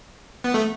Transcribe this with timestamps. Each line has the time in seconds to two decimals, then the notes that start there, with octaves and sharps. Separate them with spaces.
0.44 B3
0.54 A3